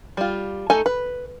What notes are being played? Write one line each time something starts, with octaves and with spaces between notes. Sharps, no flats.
G3 F4
A3 D#4 A4 G#5
B4